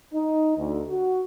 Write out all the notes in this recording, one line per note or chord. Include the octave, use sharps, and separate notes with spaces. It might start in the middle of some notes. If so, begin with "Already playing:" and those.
D#4
D2
F#4